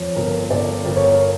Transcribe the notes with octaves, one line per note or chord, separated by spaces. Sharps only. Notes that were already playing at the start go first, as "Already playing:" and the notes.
Already playing: F2 C#5
G1 A#4
G1 D5
G1 A#4
C#5
A#4